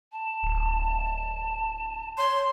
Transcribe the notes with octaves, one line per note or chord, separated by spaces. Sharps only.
A5
D1
C#5 C6